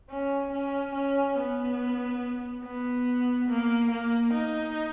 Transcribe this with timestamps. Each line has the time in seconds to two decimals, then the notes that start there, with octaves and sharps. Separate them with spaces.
0.10 C#4
0.53 C#4
0.95 C#4
1.37 B3
2.65 B3
3.49 A#3
3.91 A#3
4.34 D#4